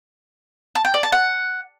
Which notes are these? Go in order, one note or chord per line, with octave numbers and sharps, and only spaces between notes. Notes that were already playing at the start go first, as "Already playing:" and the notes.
A5
G5
D5
A5
F#5